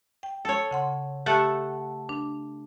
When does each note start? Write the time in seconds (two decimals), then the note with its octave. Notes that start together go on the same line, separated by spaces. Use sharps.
0.23 G5
0.45 A4 C#5
0.71 C#3 F#5 C6
1.26 A3 G4 A4 F#5
2.09 D4